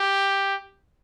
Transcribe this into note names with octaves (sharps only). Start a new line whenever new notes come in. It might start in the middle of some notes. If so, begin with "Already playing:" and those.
Already playing: G4